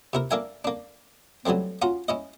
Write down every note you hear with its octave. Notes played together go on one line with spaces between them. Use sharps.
C3 E4 A#4
A#3 D4 A#4 E5 G#5
A#3 D4
E3 F#3 G3 A3 C4
C#4 F4 F#4 A#5
C#4 E4 D#5